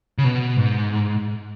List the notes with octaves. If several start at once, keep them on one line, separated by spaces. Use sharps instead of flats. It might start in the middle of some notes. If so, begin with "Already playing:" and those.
C#3
B2
G#2